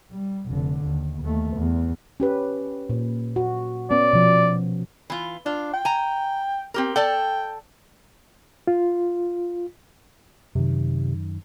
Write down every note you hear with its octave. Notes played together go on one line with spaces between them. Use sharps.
G3
F1 D3
D#2
D#2 A3
E2
C#4 G4 B4
A#2
F#4
B3 C#4 D5
B2 F3
E3 F4
D4 F4
G5
G#5 A#5
C4 G4 A#4
A4 D5 G5 A5
F4
F#2 C3 D#3